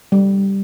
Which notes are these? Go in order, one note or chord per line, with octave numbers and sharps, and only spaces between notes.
G3